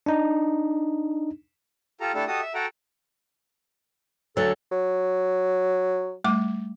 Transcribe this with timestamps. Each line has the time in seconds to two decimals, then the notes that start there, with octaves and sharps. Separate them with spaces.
0.06 D4 D#4
2.00 F4 G4 A4 A#5
2.14 A3 D4 E4 G4 A4
2.28 F#4 G4 A4 D#5 D#6
2.42 E5
2.54 F#4 A4 F#5 G5 A#5
4.37 D2 F#3 A4
4.71 F#3
6.24 G3 A3 D6